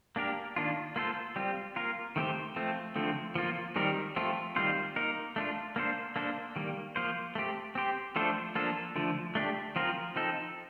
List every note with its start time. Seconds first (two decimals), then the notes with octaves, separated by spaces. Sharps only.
0.16 A#3 D4 G4 A#4
0.56 D#3 A#3 D4 F4
0.96 A#3 F4 A4 C5
1.36 G3 C4 F4
1.76 A#3 F4 A#4
2.16 D#3 A3 C4 G4 C5
2.56 F3 A3 C4
2.96 D3 F3 A3 C4
3.35 F3 A#3 F4
3.76 D#3 G3 C4 D#4 A#4
4.16 F3 A3 C4 F4
4.56 D#3 G3 C4 F4 C5
4.96 A#3 D#4 A#4
5.36 A3 D4 F4
5.76 A#3 D4 A4 C5
6.16 A#3 D4 A4 C5
6.56 D#3 G3 A#3
6.96 F3 A#3 F4 C5
7.35 A3 C4 G4
7.75 C4 G4 C5
8.16 F3 A3 D4 A4 C5
8.55 F3 A#3 D4 F4 A4
8.96 D3 F3 A3
9.35 A3 D4 G4
9.76 F3 C4 F4 A#4
10.16 F3 C4 D#4 A4